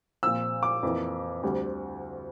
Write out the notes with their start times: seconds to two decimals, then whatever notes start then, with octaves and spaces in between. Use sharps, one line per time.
0.23 A#2 F3 C4 E6
0.63 D6
0.83 F2 E3 A#3
1.43 D2 D3 G3 C4